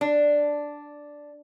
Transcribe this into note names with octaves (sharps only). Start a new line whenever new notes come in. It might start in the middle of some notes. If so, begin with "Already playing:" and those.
D4